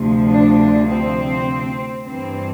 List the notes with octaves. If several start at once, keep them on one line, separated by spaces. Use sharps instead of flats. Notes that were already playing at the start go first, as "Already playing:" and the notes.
Already playing: D2 C3 F3
D4
C4
G2 E3 C4